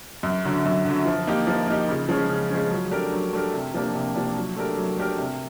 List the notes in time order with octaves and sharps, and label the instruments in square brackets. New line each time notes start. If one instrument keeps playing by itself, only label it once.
[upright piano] F#2
D3 F#3
F#2
D3 F#3
F3
A#3 D#4 G4
F3
A#3 D#4 G4
C#3
F3 G#3 C#4
C#3
F3 G#3 C#4
F#3
A3 D4 G4 A#4
F#3
A3 D4 G4 A#4
C3
F3 A#3 D4 G4
C3
F3 A#3 D4 G4
F#3
A3 D4 G4 A#4
F#3
A3 D4 G4 A#4
C3